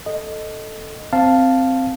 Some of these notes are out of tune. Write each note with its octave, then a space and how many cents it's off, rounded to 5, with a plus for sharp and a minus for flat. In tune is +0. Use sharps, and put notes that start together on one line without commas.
A4 +0 D#5 -5
C4 +0 F5 +0 A5 +0